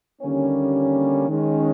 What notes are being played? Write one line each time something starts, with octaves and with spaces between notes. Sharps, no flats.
D#2 D3 G3 A#3 C#4
D#3 G#3 C#4